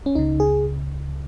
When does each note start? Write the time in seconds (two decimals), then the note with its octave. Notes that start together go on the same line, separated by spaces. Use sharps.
0.06 C#4
0.15 C#2 C#3 D#4
0.40 G#4